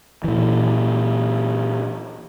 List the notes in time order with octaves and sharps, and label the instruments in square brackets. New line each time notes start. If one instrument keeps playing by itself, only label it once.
[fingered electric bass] A#2 E3